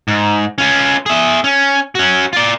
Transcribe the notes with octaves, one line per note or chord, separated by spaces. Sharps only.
G#2
C#4 F4
G#4 E5
C#4
C#4 F#4
F4 D5